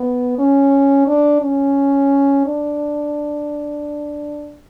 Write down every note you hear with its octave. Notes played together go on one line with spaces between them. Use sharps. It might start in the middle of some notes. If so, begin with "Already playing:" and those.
Already playing: B3
C#4
D4
C#4
D4